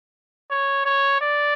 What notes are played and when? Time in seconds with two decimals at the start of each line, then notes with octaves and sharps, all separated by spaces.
0.50 C#5
0.86 C#5
1.21 D5